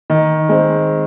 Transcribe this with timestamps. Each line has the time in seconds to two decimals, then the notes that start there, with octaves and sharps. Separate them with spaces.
0.10 D#3
0.49 G#3 C4